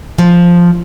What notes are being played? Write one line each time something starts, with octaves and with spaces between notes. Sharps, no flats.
F3